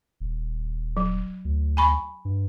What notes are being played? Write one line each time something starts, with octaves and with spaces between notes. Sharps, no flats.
D#1
F#3
D2
G#5 B5 C#6
G2